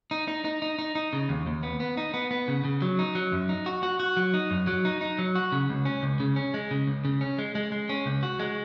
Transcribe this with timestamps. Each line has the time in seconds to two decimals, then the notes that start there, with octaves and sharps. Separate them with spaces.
0.11 D#4
0.28 D#4
0.45 D#4
0.62 D#4
0.79 D#4
0.95 D#4
1.13 C#3
1.29 D#2
1.47 D#2
1.63 B3
1.80 B3
1.97 D#4
2.14 B3
2.31 B3
2.48 C#3
2.65 C#3
2.82 F#3
2.99 D#4
3.15 F#3
3.32 F#2
3.49 D#4
3.66 F#4
3.83 F#4
4.00 F#4
4.17 F#3
4.34 D#4
4.51 F#2
4.67 F#3
4.85 D#4
5.01 D#4
5.19 F#3
5.35 F#4
5.52 C#3
5.69 C#2
5.85 C#4
6.03 C#2
6.20 C#3
6.36 C#4
6.54 G#3
6.71 C#3
6.87 C#2
7.05 C#3
7.21 C#4
7.39 G#3
7.55 G#3
7.72 G#3
7.89 C#4
8.06 C#2
8.23 F#4
8.39 G#3